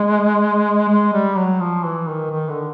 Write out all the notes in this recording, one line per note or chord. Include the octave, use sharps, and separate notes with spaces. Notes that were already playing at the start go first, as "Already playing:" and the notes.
Already playing: G#3
G#3
G3
F#3
F3
E3
D#3
D#3
D3